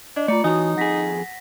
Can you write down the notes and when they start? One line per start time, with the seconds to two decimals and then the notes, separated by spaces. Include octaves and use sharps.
0.16 D4 D#5
0.28 A3 F4 D5 A#5 C#7
0.44 E3 D#4 F#4 C#5 G#5 D#6
0.77 F2 G#4 F#5 A#6 B6